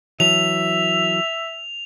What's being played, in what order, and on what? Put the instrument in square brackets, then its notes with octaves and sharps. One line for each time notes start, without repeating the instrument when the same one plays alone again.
[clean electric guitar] E3 F#3 [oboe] E5 [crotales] F7